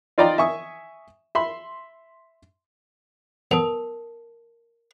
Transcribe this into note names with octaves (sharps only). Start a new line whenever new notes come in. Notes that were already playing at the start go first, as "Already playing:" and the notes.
D#4 F4 D5 G5 A#5
E5 G#5 C#6 D#6
E5 B5 C6
F#3 B3 A4 A#4 A5 D#6